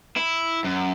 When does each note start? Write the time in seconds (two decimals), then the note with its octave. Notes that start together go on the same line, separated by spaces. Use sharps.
0.16 E4
0.64 F#2